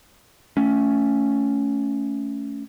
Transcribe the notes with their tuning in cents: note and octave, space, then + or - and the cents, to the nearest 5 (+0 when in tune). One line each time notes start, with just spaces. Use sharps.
A3 +0 C#4 +10